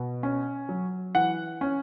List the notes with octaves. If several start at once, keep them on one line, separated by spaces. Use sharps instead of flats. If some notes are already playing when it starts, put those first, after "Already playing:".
Already playing: B2
C#4
F#3
E3 F#5
C#4